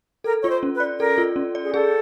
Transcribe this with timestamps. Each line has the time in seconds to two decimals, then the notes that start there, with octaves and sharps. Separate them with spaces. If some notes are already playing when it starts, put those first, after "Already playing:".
0.24 A4 A#4
0.42 F4 C#5
0.49 C5
0.63 C#4
0.75 B4
0.80 D5
0.99 A4 A#4
1.18 F4
1.36 C#4
1.55 D5
1.63 G#4
1.74 G#4 A4